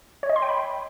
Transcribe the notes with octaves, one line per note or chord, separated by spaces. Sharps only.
C#5
D#5
C6
G5
B5